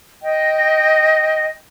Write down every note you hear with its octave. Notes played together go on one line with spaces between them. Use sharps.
D#5 G5